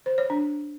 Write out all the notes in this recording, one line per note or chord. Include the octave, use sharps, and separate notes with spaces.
C5
C#5
D4